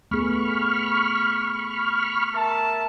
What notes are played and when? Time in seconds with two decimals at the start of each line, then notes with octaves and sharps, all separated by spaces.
0.11 A3 B3 G#4 B5 C#6 F6
2.34 A#4 E5 A5